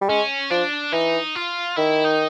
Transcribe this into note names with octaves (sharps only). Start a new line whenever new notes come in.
G3
G#3 C#4
F3 D4
E3 D#4
F4
D#3 E4
D#4